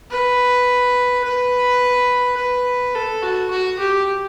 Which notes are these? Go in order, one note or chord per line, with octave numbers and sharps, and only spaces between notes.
B4
B4
B4
A4
F#4
F#4
G4